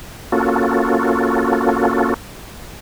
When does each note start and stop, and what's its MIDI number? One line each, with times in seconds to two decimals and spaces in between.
0.32 2.14 58
0.32 2.14 61
0.32 2.14 65
0.32 2.14 66
0.32 2.14 69